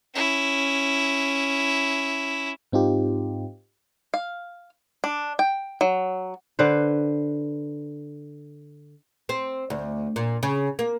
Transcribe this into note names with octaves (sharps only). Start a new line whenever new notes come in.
C#4 E4
G#2 C4 D#4 F4 G4
F5
D4
G5
F#3
D3 B4 C5
C4
D2
A#2
C#3
A#3